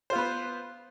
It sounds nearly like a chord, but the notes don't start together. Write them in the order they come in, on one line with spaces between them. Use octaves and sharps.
C5 F4 B3 B4